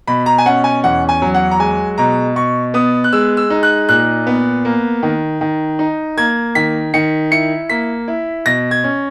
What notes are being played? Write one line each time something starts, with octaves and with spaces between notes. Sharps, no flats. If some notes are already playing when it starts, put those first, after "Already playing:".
B2 B5
A#5
G#5
C#4 F#5
G#5
E2 F#5
G#5
F#3
F#5
A#5
G#3 G#5
B2 A#5
B2 C#6
B3 D#6
F#6
G#3 E6
E6
D#4
F#6
A#2 F#6
B3
A#3
D#3
D#3
D#4
A#3 G#6
D#3 B6
D#3 C#7
E4 C#7
A#3 B6
E4
B2 A#6
G#6
C#4